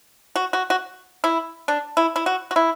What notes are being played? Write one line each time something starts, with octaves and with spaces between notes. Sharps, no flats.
F#4
F#4
F#4
E4
D4
E4
E4
F#4
F#4
E4